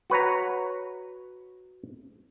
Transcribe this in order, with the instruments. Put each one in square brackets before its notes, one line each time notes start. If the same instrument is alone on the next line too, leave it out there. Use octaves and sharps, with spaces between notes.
[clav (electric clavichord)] F#4 B4 C#5 A#5